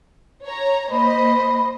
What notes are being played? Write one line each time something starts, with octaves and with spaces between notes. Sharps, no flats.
C#5 A#5
A#3 C5 D#5 B5